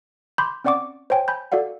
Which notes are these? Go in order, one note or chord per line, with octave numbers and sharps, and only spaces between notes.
B5 C6 D6 G6
C4 C#4 D5 F#5 C#6 D6
C5 C#5 G5 G#5
G#5 B5 G6
F#4 A4 D5 F5 F#5